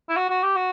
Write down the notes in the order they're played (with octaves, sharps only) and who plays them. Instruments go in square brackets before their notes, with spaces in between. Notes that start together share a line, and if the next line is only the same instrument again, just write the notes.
[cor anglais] E4
F#4
F#4
G4
F#4